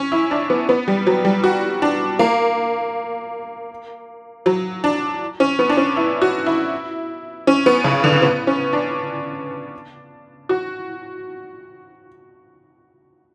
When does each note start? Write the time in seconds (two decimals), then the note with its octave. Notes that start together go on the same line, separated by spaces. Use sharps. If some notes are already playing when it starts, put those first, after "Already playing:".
Already playing: C#4
0.12 E4
0.31 D4
0.50 B3
0.69 B3
0.88 G3
1.07 F#3
1.25 G3
1.44 F#4
1.82 D4
2.19 A#3
4.46 F#3
4.84 D4
5.40 C#4
5.59 B3
5.69 D4
5.77 C#4
5.97 E4
6.22 F#4
6.46 E4
7.47 C#4
7.66 B3
7.84 C#3
8.04 D3
8.22 B3
8.47 C#4
8.73 D4
10.49 F#4